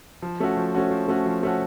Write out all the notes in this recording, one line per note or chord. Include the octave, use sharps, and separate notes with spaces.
F3
A3 C#4 F#4
F3
A3 C#4 F#4
F3
A3 C#4 F#4
F3
A3 C#4 F#4